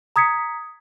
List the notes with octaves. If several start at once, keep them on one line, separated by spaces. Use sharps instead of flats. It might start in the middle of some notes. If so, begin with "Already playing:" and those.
A#5 D#6 G#6 B6 C#7